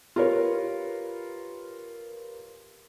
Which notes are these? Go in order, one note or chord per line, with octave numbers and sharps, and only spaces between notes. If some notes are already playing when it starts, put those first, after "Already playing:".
F4 G4 A#4 B4 C#5